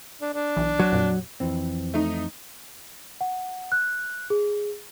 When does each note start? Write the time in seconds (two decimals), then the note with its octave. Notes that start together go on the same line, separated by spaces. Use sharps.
0.21 D4
0.34 D4
0.57 B1 E3
0.80 F#3
0.93 F2 A#2
1.40 F2 E3 C4
1.94 A3 D#4
3.21 F#5
3.72 F#6
4.30 G#4